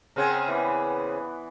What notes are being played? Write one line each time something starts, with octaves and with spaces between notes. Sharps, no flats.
C#3 C4 G#4 A#4 F#5 G#5
E3 B3 D5